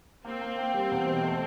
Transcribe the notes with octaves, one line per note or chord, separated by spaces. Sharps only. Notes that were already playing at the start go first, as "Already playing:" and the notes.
A#3 C4
A#3
A#3
G3
E2
B2
A3